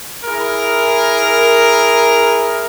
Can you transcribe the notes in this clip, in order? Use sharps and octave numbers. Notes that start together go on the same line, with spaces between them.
E4 G#4 A#4